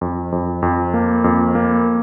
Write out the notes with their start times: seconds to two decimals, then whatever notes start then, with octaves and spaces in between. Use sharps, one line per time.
0.01 F2
0.32 F2
0.62 F2
0.94 A#3
1.24 F2
1.55 A#3